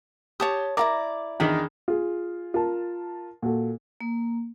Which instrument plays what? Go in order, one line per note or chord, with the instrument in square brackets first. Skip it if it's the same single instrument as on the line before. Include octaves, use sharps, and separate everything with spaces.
[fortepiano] G4 [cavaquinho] C#5 A5 D#6
[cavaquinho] E4 F4 D5 [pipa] A#4 A#5 [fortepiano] D6
[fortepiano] E2 D#3 D#4 [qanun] D4 G#4 B5
[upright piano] F4 G#4
F4 A#4 A5
A#2 F#4 A4
[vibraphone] A#3